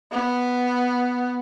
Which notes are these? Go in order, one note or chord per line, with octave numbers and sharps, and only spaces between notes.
B3